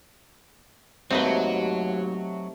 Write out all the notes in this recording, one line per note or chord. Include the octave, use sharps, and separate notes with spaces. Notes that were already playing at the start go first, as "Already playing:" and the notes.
D#2 G#2 C3 F#3 A3 C4 D#4 B4